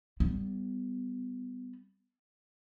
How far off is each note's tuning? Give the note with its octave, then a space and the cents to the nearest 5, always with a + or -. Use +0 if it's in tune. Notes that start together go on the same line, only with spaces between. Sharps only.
G3 +0 B3 +20